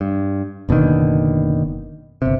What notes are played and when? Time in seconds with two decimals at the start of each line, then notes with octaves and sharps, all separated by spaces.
0.01 G2
0.69 F#1 B2 D3 D#3
2.22 G1 C3